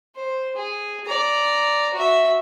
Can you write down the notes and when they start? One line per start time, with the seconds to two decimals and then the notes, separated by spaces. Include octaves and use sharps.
0.16 C5
0.56 G#4
1.06 D5 A#5
1.94 F#4 E5